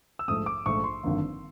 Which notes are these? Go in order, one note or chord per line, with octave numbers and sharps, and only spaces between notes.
E6
A#1 G#2 F3 A3 D#6
D6
A#1 G#2 F3 A3 C#6
C6
G#1 G2 D3 F3 A#3